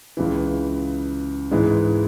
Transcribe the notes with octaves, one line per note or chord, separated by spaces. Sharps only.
C#2 C#3 E3
G#2 E3 G#3